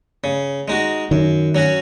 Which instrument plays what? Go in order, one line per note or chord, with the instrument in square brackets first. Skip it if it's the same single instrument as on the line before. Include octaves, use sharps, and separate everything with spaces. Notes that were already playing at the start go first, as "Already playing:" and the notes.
[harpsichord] C#3
G#3 D#4 F#4
[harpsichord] F#2 [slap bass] D#3
[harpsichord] F#3 C#4 F#4